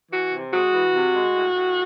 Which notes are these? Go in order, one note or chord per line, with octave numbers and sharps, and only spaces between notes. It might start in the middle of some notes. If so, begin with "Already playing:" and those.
E3 F#4
C3
G#3 F#4
E3
C3
G#3
A2
A2